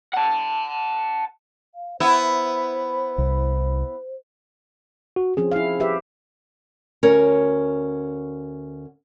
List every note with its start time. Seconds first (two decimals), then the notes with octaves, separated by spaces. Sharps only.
0.14 F#5 A5
1.75 F5
2.00 B3 E4 C5
3.18 C2
5.16 F#4
5.37 F3 C4 C#4 G#4
5.52 E4 F5
5.80 G4 B4 E5
7.03 D2 C#4 A#4 C#5